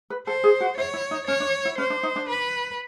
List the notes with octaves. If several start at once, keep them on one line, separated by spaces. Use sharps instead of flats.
B4
A4 C5
G#4
F#4
E4 C#5
E4
D#4
C#4 C#5
D4
E4
C#4 C5
D4
D#4
D4
B4